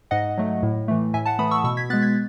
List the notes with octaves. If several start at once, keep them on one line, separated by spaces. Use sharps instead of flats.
G#2 D#5 F#5
F#3 A3
A2
E3 A3
A2 E5 G#5
F#5 A5
E3 A3 B5 D#6
C#6 E6
B2 C#6 E6
G#6 B6
G#3 B3 F#6 A6
G#6 B6